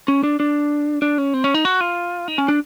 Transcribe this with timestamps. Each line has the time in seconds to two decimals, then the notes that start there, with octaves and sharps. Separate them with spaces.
0.08 C#4
0.23 D4
0.40 D4
1.02 D4
1.18 C#4
1.34 C4
1.44 C#4
1.55 D#4
1.65 F#4
1.81 F4
2.28 D#4
2.38 C#4
2.48 D4